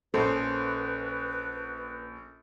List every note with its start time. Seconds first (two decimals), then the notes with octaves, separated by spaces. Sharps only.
0.14 A#1 A#3 C#4 A4 B4 C5